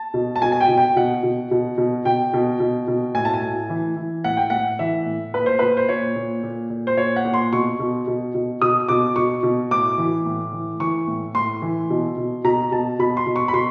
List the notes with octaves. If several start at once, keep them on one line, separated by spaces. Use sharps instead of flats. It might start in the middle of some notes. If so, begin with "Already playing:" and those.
Already playing: A5
B2
A5
B2 G#5
G#5
G5
B2
G5
B2 F#5
B2
B2
B2
B2 G5
B2
B2
B2
A2 G#5
A5
G#5
A2
E3
E3
A2 F#5
G5
A2 F#5
E3 E5
A2
A#2 B4
C5
A#2 B4
C5
A#2 C#5
A#2
A#2
A#2
C5
A#2 C#5
F#5
A#2
C6
B2 C#6
B2
B2
B2
B2 D#6
B2 D6
B2 C#6
B2
A2 D6
E3
A2
E3
E3 C#6
A2
A2 C6
E3
B2
B2
B2 A#5
B2 A5
B2 B5
C6
B2
C#6
B5
B2 C6